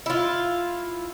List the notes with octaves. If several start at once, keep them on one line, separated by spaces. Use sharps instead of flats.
E4 F4